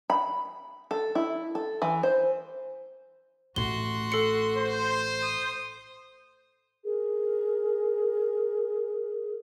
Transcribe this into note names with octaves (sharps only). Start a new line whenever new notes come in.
B5
A4
E4
A4
E3
C5
A1 A3 F#4 C6 G7
A4 C#7
C5
D#6
G#4 A#4